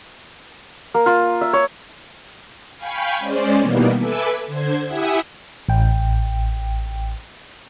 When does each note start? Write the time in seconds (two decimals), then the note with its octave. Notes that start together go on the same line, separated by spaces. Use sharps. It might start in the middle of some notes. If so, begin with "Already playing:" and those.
0.94 A#3
1.06 F4
1.41 E5
1.53 C#5
2.76 F5 G5 G#5 B5 C#6 G6
3.19 G#3 C#4 C5 D5
3.58 B2 D#3 E3 G3 A#3 B3
3.98 A4 B4 E5 G#5 D6
4.46 D3 C5 G#6
4.86 E4 G4 E5 F#5 G#5 D#6
5.69 A1 G5